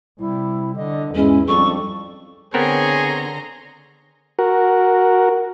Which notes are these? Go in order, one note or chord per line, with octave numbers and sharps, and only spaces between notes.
C3 G3 E4
D3 D#5
E2 G#2 G#3 C#4 E4
F2 G3 D4 A4 C#6
D3 B3 C4 G#4 A#4 C#5 A#5 C6
F#4 A#4